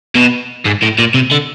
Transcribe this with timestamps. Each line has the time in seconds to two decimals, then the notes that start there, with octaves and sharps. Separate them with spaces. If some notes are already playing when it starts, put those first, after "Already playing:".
0.15 B2
0.65 G#2
0.82 A2
0.98 A#2
1.14 C3
1.32 D3